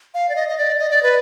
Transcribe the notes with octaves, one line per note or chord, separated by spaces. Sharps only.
F5
D5
D#5
D#5
D5
D#5
D5
B4